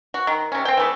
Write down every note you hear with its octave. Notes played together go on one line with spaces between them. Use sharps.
F#4
D#3
C3 C#4
C4 G5
E3 A3 B3